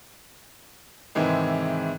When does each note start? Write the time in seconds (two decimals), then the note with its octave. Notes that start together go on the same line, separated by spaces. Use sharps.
1.15 G#2 C3 D#3 E3 G#3 E4